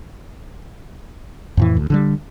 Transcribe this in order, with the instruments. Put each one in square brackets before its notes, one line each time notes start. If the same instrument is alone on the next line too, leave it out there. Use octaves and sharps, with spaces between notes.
[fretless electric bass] F2 A2 E3
D2
D3 D#3 G3